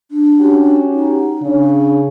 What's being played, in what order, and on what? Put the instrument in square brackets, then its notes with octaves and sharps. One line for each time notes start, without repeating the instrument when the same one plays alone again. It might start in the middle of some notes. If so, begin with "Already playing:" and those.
[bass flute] D4
[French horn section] C#4 F#4 G4
[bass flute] D#4
[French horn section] C#3 [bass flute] D4